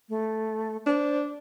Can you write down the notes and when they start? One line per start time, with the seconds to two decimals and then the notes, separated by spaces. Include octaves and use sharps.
0.09 A3
0.87 D4 C5